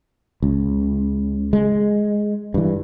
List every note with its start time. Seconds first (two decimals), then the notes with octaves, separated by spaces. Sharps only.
0.43 C#2
1.53 G#3
2.54 G2 E3